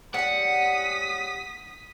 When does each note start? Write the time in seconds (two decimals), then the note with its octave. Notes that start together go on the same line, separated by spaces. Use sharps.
0.14 G3 C#4 F#5 D#6 B6